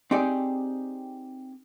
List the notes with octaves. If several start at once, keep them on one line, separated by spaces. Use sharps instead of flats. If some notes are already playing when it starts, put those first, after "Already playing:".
C4 D#4 G4 G#4 D5